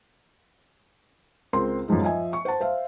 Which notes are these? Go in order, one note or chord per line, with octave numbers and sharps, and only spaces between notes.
C#2 C4 A#4 C6
F#2 A2 E3 F3 G#3 D#4
F3 D#5 E5 G#5
C#6
C5 F#5 A5
C5 E5 F5